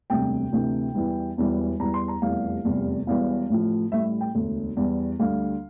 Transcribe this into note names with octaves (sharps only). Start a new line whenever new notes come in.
E1 D2 C3 G3 G5
D2 C3 E3
E2 E3 G3
E1 E2 E3 G3
E2 E3 G3 A#5
C6
A#5
F1 E2 E3 G3 F5
F1 E2 C3 G3
E1 E2 E3 G3 F5
A1 A2 F3
A1 A2 G3 E5
G5
E1 D2 D3
E2 E3 G3
D2 D3 G3 F5